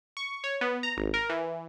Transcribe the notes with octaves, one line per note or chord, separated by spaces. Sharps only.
C#6
C#5
B3
A#5
G#1
A#4
E3